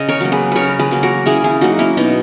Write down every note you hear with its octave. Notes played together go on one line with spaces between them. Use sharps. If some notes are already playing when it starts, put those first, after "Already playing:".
Already playing: C#3 D#5
A#4 C#5
F#3 A#3
G#4 B4
C#3 A#4 B4 C#5
G#4 B4
F#3 A#3
F#4 A#4
C#3 E4 G#4
E4 G#4
F#3 A#3 D#4 F#4
C#4 E4
B2 D#4